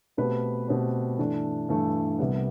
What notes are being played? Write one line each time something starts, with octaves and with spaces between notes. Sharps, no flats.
B2 A3 C4 G4 B4
B2 A3 C4 G4 B4
G2 E3 A3 D4 A4
G2 E3 A3 D4 A4
C2 C3 G3 B3